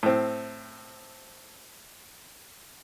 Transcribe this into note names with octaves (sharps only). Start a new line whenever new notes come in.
A2 C4